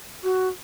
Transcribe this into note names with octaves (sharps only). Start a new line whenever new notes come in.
F#4